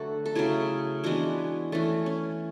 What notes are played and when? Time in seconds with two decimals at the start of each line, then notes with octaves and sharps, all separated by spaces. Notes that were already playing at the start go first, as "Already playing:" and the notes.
Already playing: D3 F#3 A3 F#4 A4 B4
0.26 A4
0.35 C#3 F#3 A3 E4 G#4
1.04 E3 G#3 B3 D4 F#4
1.72 E3 A3 C#4
2.06 C#4